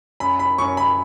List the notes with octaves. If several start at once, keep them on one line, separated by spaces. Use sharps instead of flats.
F#2 B5
B5
F#2 C#6
B5